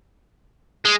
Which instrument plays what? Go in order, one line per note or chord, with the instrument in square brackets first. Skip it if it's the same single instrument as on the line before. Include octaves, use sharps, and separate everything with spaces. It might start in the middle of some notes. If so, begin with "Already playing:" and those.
[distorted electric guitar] G#3